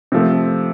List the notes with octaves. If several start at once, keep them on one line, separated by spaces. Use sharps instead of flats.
C3 F3 A3